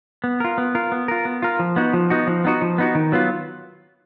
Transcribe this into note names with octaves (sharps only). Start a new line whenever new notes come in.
B3
F4 A#4
B3
F4 A#4
B3
F4 A#4
B3
F4 A#4
F3
B3 D#4 F#4
F3
B3 D#4 F#4
F3
B3 D#4 F#4
F3
B3 D#4 F#4
D#3
F#3 B3 F4